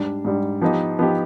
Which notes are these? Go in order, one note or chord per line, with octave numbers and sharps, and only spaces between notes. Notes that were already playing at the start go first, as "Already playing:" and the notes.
Already playing: G#2 G3 D4
G#2 G3 D4
F3 B3 D#4 G4
F3 B3 D#4 G4